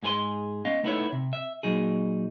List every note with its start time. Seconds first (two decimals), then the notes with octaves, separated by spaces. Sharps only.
0.03 G#2 G#3 G#4 B4 G#5 C6
0.65 B3 C#4 D#5 F5
0.84 A3 B3 D#4 E4 A4 C#5
1.12 C3
1.33 E5
1.63 A#2 F#3 D#4 G#4